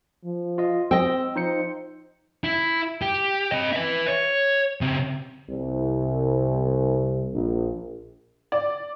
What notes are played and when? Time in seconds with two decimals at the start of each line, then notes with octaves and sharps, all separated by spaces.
0.24 F3
0.58 F4 D#5
0.91 C4 D#5 G5 E6
1.36 F3 D#4 C5 C#7
2.44 E4
3.02 G4
3.52 C4 D#5
3.73 B4 E5
4.08 C#5
4.81 C#3 C4
5.49 C2
7.34 A#1
8.52 D5